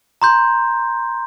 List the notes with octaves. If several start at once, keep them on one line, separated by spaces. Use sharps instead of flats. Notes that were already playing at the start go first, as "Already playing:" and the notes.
A#5 C6 G6